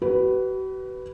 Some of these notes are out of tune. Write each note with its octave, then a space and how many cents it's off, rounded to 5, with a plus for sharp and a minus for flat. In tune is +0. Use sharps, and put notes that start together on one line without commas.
F#4 +45 B4 +0